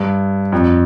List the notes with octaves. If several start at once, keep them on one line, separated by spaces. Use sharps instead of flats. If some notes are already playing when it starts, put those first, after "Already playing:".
Already playing: G2
F2